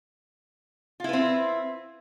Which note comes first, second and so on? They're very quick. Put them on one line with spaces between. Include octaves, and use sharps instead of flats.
F4 E4 B4 C4